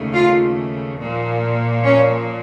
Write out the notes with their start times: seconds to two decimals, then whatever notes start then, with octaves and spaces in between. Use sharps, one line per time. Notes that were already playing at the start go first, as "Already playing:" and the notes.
Already playing: D#2 C#3 A3
0.13 F4 F5
0.99 A#2 F3 A#3
1.84 C#4 C#5